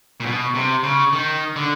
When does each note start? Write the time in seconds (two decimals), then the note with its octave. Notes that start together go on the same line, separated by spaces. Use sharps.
0.20 A#2
0.26 B2
0.55 C3
0.83 C#3
1.13 D#3
1.56 D3